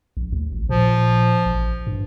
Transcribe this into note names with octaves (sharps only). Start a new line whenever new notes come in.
A#1
D2
A1
A#2 F3
A1
G2